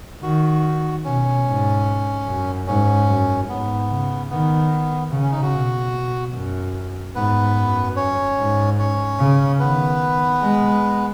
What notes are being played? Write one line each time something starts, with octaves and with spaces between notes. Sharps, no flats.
D#3 F#4
B2 C#4
G#2
F#2
G#2 C#4
F#2
G#2 B3
C#3
D#3 B3
C#3
C#4
D#4
F#4
B2
B2
F#2
G#2 B3 B4
F#2
C#4 C#5
G#2
C#4 C#5
C#3
D#3 B3 B4
G#3